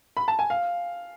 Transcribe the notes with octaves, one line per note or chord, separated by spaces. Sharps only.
B5
A5
G#5
F5